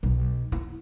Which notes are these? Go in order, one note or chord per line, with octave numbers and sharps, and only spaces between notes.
B1
E4